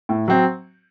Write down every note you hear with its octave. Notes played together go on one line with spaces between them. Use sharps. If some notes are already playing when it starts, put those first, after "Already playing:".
A2
F#3 C4